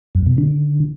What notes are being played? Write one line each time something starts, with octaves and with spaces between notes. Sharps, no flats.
F#2
B2
D3